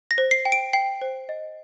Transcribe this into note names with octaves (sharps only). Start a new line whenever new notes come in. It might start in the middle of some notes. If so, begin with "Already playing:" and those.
A#6
C5
C7
G5
D7
G5 C7
C5
D#5